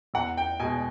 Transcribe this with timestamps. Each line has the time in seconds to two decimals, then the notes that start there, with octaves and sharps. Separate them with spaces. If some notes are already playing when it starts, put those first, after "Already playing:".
0.14 E2 F#5
0.37 G5
0.60 B2 G#3 G#5